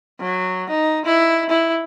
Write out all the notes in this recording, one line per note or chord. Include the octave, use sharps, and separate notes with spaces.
F#3
D#4
E4
E4